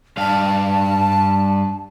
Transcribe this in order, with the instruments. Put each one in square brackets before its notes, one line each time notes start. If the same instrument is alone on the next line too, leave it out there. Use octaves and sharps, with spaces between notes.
[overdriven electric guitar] G2 F5 [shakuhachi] A5